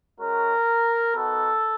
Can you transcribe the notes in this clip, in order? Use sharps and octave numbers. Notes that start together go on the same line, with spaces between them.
G#3 C#4 F#4 A#4
B3 D#4 F#4 A4